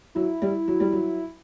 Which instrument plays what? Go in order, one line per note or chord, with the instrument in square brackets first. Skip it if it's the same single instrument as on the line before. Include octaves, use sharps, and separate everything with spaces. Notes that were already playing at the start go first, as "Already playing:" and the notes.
[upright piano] F#3 [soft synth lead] E4
[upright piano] G3
F#3
G3
F#3